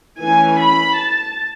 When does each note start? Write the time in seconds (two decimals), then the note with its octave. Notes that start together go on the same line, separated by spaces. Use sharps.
0.19 E3 A3 C#4 G#5
0.59 B5
0.97 A5